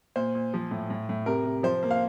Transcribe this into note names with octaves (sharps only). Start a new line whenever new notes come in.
A#2 C5
A#2
F3
A2
A2
A2
C3 A#4
C3
F3 C5
A#3
F5